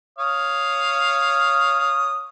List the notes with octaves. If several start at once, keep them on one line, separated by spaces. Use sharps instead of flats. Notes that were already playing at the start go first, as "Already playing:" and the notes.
C#5 F5 D#6